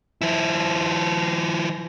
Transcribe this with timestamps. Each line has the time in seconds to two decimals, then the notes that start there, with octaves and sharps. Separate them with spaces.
0.22 F3 E4